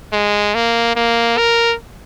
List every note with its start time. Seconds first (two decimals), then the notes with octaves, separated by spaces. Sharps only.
0.13 G#3
0.55 A#3
0.96 A#3
1.38 A#4